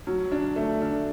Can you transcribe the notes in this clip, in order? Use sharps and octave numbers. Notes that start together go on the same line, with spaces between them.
F#3
D4
A3
D4